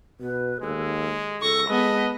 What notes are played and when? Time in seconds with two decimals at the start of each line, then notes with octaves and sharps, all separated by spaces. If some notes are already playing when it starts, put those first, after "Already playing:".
0.20 B2 B4
0.62 D#2 G#3 A4
1.41 C#2 A4 C#6 A#6
1.70 G#3 B3 D#5 A5